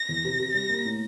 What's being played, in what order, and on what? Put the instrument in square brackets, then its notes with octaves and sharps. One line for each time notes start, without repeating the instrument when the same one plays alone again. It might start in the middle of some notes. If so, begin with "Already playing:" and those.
Already playing: [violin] A#6
[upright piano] E2
C3
C3
[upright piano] G3 [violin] A#6
[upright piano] A#3
A2